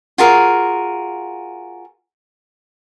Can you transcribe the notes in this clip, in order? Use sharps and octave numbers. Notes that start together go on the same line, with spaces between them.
F4 F#4 G#4 A#4